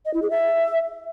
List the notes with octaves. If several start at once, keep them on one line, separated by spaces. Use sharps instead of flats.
D#5
E4
G#4
E5